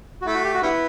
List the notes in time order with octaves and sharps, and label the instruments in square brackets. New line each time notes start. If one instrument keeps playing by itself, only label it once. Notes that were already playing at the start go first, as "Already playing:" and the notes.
[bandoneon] F#4
[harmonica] A3 [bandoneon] E4
[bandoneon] F#4
G4
F#4
[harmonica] D3 G3 B3 [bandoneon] E4